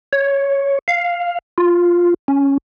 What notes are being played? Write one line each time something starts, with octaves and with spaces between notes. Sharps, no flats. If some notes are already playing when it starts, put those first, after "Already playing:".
C#5
F5
F4
C#4